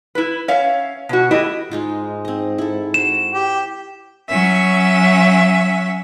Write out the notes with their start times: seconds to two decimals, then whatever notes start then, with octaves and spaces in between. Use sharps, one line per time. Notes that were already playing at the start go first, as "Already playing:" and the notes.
0.15 E4 B4
0.48 C#4 C#5 E5 F5
1.09 B2 F#4
1.31 A3 E4 G4 D#5
1.71 G#2 G#3 D#4 F4
2.25 C4 D#5
2.58 E4 A4
2.94 F#4 C5 E7
3.34 G4
4.29 F#3 C#4 E5